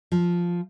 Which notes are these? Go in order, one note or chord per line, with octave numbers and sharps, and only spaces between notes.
F3